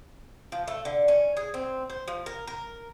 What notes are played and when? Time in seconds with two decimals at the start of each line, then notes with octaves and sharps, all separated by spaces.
0.52 F3
0.68 A3
0.85 D3
1.08 C#4
1.37 G#4
1.54 C4
1.90 C5
2.08 F3
2.26 A#4
2.47 A#4